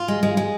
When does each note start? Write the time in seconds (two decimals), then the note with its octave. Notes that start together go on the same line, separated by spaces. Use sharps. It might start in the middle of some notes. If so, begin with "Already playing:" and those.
Already playing: F4
0.08 G#3
0.23 G#3
0.37 G#3